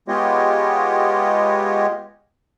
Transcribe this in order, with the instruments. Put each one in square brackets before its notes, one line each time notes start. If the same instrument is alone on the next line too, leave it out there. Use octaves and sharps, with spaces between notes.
[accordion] G#3 B3 F4 G4 C#5 D#5